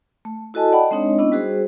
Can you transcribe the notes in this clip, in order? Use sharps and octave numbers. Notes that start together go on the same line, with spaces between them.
A3
E4 F#4 A4 D#5 G#5 A5
D5 D#5 F#5 G5 A5 B5
G#3 C4 D4 D#4 C#5 D#5
B3 C#4 D4 E4 D#5
G3 F#4 G#4 C5